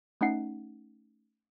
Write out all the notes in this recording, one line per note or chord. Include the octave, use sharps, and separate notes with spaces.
A3 C#4 D#4 F#5 C7